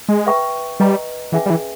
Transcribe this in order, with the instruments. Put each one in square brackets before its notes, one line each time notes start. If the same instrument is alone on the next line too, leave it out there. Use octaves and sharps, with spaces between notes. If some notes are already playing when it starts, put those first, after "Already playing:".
[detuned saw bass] G#3
[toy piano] B4 E5 G5 A#5 C#6
[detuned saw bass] G3 [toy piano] B4 D#5 A#5
[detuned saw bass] E3 [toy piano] C#4 G#4 B4 E5 G#5
[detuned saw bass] G3
E3